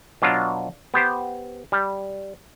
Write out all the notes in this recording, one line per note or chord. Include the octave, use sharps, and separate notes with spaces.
B2 F#3 D4 F4
B3 G4 C5
G3